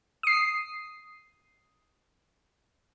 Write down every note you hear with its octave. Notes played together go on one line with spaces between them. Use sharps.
D#6 C7